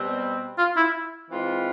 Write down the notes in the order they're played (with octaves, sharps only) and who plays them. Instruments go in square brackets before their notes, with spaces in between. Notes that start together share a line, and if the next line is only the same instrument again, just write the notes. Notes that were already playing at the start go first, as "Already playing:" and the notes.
Already playing: [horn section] B2 G3 C4
[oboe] F4
E4
[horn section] E3 G#3 C4 F4